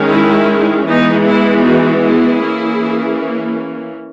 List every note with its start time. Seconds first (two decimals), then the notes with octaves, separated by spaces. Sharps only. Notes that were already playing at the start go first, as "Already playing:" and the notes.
Already playing: D#3 G#3 C#4
0.10 E4
0.87 E3 G#3 B3 D#4
1.26 E4
1.64 D#4 F#4
2.02 E4 G#4
2.42 E3 A#3 C#4